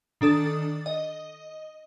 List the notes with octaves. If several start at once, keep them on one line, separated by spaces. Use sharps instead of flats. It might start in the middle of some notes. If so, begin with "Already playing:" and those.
D#3 D4 A4 D#6 A6
D#5